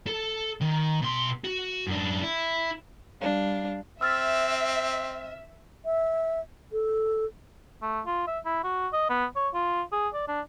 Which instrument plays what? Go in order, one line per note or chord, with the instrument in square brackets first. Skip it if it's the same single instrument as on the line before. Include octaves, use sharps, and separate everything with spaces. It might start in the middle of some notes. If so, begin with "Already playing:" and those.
[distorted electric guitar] A4
D#3
B2 C6
F#4
F#2 D4
E4
[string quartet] G3 D4 F5
[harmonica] C4 [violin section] E5 [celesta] E6 F6 A6
[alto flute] E5
A4
[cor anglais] A3
F4
E5
E4
F#4
D#5
B3
C#5
F4
G#4
D5
D4